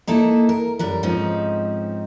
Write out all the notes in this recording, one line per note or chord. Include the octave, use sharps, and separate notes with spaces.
A#3 D#4 E4 A4
A#4
F#2 G3 A#4
G#2 F3 C4 C#4 D#4